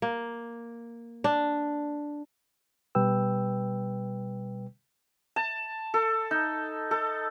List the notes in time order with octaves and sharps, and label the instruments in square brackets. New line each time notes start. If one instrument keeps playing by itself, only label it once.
[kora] A#3
D4
[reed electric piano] B2 G3 B4 G5 E6
[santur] A5
A4
D#4
A4